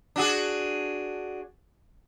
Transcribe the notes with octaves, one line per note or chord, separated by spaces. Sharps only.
D4 F#4 G#4